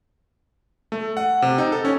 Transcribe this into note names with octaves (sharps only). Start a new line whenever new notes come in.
A3
F#5
C3
D#4
A4
C#4